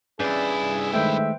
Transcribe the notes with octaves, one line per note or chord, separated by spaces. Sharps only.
G2 C#4 E4 G#4 B4 D5
D#3 G#3 A3 B4 C5 E5 G5